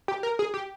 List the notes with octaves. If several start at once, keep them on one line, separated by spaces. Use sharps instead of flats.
G4
A#4
G#4
G4